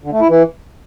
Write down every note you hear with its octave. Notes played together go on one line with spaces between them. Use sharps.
D3
A3
E4
E3